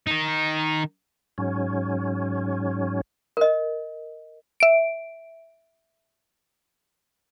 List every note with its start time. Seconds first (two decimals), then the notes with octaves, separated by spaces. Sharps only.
0.07 D#3 D#4
1.38 G#2 F#3 C#4
3.37 A#4 D#5
4.60 E5 D7